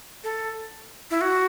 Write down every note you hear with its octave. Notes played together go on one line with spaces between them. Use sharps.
A4
E4
F#4